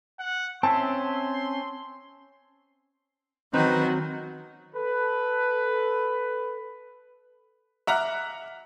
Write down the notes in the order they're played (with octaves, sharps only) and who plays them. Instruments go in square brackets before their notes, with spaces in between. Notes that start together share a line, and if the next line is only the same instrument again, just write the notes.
[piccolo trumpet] F#5
[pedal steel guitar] C4 C#4 E5 [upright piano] A5 [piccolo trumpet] C6
[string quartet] D#3 F#3 F#4 [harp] C4 [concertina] D#4 B4
[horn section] A4 B4
[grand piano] E5 F#5 A#5 D6 F6 F#6